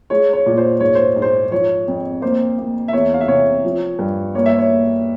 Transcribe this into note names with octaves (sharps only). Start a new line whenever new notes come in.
G#3 C#5
C#5
A#2
C5
G#2 C#5
C5
G#2
C5
F3 C#5
F2
A#3 C5
A#3
E5
E2 C#5
F5
E5
C3 C#5
F3
G2
A#3 C#5
E5
C#5
A#3